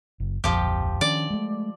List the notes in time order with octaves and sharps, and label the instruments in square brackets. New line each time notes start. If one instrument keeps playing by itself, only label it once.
[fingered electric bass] F#1
[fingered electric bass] D1 A#1 F2 [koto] F3 G4
[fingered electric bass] D#3 C#4 D4 [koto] D5
[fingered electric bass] G#3 A3